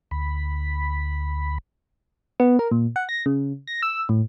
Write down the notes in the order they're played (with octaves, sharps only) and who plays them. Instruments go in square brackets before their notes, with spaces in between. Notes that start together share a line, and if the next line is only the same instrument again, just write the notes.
[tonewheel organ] D2 B5
[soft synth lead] B3
A#4
A#2
F#5
A#6
C#3
A#6
E6
A2